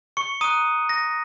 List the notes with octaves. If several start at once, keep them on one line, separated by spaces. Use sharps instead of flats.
C#6 C#7
A#5 C#6 D#6 F#6 D#7
A#6